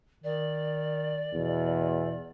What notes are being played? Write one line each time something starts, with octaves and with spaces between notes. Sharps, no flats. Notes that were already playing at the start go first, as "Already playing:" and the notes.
D#3 D5
E2 B2